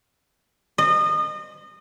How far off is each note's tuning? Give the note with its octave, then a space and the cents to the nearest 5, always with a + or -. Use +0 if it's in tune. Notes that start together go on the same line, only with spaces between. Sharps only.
D#5 -30